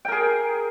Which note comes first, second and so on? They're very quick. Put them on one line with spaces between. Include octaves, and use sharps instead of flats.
G5 A#4 G#4